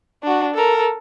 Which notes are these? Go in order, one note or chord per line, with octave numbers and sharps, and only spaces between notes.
D4 F#4
A4 A#4